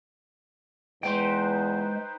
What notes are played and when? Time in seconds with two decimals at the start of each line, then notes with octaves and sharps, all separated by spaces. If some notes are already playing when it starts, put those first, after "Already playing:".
1.03 E2 G#3 D#4 B4 C5 G5 C6